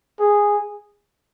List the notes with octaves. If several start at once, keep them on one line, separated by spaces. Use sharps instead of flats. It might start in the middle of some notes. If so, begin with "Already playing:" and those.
G#4